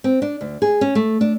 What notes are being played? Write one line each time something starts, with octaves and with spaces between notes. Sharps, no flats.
C4
D4
D2
G#4
C#4
A3
D4